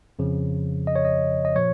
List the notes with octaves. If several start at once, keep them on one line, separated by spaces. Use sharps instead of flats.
F2 C#3 F3
D#5
C#5
D#5
D#5
A#2 F3 C#5